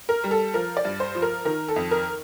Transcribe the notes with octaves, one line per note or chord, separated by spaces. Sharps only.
A#4
G3
A4
F3 A#4
D5
G2
C5
F3
A#4
D#3 A#4
A4
F2
A#4